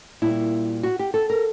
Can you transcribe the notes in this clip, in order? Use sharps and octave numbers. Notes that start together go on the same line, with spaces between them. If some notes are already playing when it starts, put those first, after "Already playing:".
A#2 G3 A#3 E4
F#4
G4
A4
A#4